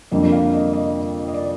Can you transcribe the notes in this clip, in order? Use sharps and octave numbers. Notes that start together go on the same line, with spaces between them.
F2 D3 G3 A#3 D4 D#5
F5
D#5
D#5
D#5
D5